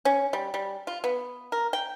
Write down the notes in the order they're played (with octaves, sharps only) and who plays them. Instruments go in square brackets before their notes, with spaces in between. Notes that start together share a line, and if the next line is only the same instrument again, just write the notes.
[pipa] C#4
G3
G3
F4
B3
A#4
G5